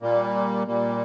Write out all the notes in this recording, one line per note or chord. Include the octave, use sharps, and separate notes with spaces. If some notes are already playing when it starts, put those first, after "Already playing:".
A#2 G3 A#3
A#2 G3 A#3